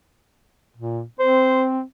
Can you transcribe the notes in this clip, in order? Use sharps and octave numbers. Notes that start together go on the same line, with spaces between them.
A#2
C4 C5